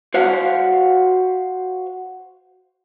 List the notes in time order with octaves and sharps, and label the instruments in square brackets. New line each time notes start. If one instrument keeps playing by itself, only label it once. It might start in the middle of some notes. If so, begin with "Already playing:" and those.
[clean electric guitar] F#4 C5 F5 F#5